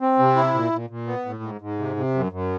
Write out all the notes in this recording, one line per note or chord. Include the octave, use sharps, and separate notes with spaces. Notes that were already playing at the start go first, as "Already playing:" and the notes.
C4
C3
E4
A#2
A#2
A#2
B3
A2
G#2
G#2
C3
C3
F#2
F#2